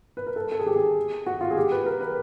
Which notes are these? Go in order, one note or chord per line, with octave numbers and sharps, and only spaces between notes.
B4
A#4
A4
A4
G#4
G4
G#4
F#4
F4
G#4
G4
B4
A#4
B4